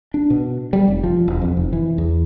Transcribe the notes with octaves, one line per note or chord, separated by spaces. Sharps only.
D4
B2
G3
F1
F3
E1
F2
F1
E3
E2